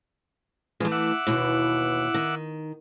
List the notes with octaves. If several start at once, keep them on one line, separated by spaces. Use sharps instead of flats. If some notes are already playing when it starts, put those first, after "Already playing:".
E3 F3 G#3 A3
E5 F#5 D6
D#2 B2 E3
D#3